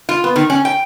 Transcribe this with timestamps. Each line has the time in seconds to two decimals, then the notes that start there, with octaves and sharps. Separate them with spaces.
0.09 F4
0.24 B3
0.36 D#3
0.50 C#4
0.65 G5